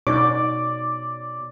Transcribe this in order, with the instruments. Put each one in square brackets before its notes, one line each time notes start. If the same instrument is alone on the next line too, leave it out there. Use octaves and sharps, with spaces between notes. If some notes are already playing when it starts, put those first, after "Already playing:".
[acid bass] B2 [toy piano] D#4 C#6 [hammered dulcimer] D5 [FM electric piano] D6